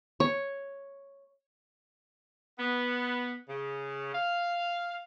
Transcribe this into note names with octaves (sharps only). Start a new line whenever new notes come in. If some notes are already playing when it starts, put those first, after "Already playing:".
C#5
B3
C#3
F5